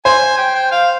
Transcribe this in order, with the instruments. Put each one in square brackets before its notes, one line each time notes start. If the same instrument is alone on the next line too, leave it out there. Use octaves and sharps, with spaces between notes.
[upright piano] C5 [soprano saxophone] G#5
[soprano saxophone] G5
G5
F5